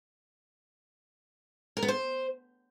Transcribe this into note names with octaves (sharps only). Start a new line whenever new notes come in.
A#4
B3
C5